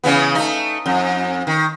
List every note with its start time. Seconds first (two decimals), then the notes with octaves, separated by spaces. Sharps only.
0.04 C#3 E3 B3
0.35 A3 D#4
0.86 F2
1.47 D#3